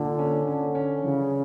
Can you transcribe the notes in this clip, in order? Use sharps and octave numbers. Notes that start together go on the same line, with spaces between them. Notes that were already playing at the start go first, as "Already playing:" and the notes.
Already playing: A#2 D3
C#4
D3 C#4
C#4
C#3 E3